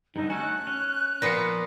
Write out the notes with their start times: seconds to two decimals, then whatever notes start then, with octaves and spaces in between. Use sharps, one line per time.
0.16 G2 D3 D#4
0.30 A3 C#4 F#4 G#5 F#6
0.67 C#4
1.22 A#2 F3 B3 A#6 C7 C#7